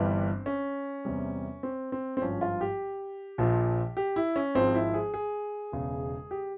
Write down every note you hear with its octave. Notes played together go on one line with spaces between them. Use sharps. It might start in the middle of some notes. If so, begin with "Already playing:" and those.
Already playing: G1 G2 E3 G3 C4
C#4
E2 C3 G3
C4
C4
C4
G#1 G2 F3 C#4
F4
G4
A#1 A#2 F3
G4
E4
C#4
G#1 G#2 F3 C4
E4
G#4
G#4
E1 E2 C#3
G4